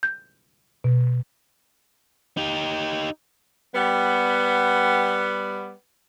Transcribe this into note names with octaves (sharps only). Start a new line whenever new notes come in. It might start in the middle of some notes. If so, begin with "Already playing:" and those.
G6
B2
D#4 G4
G3 B3